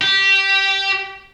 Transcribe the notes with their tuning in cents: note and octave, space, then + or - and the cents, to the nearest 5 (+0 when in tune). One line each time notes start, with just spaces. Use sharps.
G4 -10